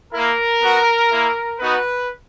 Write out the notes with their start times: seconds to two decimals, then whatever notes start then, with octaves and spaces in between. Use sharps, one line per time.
0.13 A#3 E4 A#4
0.61 B3 F#4
1.10 A#3 E4
1.59 B3 D#4 F#4 B4